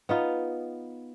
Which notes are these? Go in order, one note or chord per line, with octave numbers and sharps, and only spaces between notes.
B3 D#4 F4